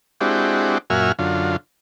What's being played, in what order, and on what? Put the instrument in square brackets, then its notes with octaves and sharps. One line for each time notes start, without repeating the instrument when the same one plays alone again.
[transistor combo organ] G#3 C4 D4 E4 F#4 G4
F#2 A#2 F#4 E5 G#5 F6
F#2 D3 F4